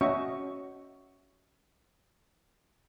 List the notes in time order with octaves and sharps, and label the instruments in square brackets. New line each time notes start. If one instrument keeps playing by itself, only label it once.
[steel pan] C#4 F#4 D#5 E5 C#6